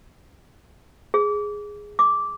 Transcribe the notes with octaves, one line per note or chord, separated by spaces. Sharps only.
G#4
D6